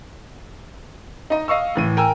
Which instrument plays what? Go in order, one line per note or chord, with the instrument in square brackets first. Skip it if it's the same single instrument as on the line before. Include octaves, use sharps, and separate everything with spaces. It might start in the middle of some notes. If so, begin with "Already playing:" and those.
[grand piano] D#4 D#5
D#5 F5 C#6 E6
A2 E3 D#7
A#4 G5 G#5 E6